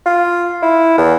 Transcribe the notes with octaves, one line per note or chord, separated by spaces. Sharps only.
F4
E4
E2